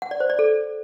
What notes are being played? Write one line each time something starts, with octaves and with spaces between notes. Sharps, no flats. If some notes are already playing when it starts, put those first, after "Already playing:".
F#5
D5
C5
D5
A4